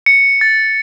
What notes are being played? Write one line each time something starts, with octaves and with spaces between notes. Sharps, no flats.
C#7
A6